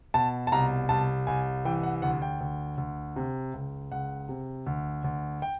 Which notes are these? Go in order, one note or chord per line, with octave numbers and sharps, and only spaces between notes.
B2 A5
A5
C2 A#5
C2 A5
C2 G#5
E3 G5
F#5
D2 F#5
G5
D2
D2
C3
C#2
C#2 F#5
C3
D2
D2
G5